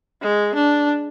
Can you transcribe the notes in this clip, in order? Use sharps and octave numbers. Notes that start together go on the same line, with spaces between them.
G#3
D4